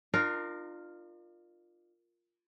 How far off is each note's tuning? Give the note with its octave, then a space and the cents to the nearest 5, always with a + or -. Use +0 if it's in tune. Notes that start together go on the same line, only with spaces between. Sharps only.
D4 +45 F4 +0 A#4 +0